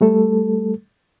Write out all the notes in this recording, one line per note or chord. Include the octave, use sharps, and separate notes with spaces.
G3 A3 A4